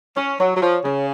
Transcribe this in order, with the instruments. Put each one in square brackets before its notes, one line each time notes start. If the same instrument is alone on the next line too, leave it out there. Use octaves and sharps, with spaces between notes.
[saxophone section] C#4 [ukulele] C#5
[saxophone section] F#3 [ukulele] C#5
[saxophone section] F#3
[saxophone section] F3 [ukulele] C#5
[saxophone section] C#3 [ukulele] C#4